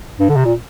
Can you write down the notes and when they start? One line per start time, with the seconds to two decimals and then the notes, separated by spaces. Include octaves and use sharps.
0.20 G2
0.29 D3
0.37 C3
0.45 A#2